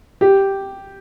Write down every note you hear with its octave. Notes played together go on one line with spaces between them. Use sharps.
G4